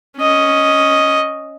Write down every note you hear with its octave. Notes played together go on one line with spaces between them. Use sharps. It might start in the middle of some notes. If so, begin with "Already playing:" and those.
C#4 D#5